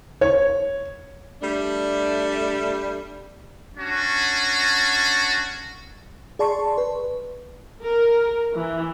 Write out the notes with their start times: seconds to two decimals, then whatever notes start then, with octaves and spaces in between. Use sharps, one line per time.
0.21 C#5
1.42 G3 A3 D4
3.78 C#4 D4 F#4
6.39 G#4 D5 A5 C6 C#6
6.78 B4
7.84 A#4
8.53 E3